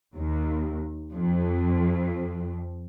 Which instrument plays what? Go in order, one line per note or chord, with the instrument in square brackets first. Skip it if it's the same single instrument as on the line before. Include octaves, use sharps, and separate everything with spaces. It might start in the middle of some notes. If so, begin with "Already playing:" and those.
[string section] D#2
F2